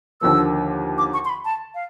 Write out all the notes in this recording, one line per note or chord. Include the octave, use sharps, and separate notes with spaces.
D#2 D3 F3 A#3 E6
D6
C#6
C6
B5
A5
F5